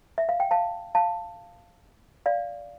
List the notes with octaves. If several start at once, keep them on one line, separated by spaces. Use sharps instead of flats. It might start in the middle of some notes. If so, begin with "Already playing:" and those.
E5
F5
G5
F5 A5
F5 A5
D5 F5